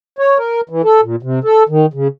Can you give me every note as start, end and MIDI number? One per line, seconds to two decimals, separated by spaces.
0.19 0.38 73
0.38 0.61 70
0.69 0.82 52
0.84 1.01 69
1.03 1.16 46
1.23 1.39 48
1.44 1.63 69
1.69 1.86 51
1.93 2.08 49